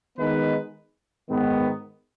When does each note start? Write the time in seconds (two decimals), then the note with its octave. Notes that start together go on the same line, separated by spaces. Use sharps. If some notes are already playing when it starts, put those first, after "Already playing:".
0.17 D#3 G#3 B3 D#4 B4
1.29 G#2 D#3 B3